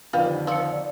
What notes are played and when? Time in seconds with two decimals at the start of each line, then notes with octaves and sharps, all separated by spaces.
0.13 F2 D3 D#3 F4 G4 B4
0.47 F3 E6 C#7
0.73 D5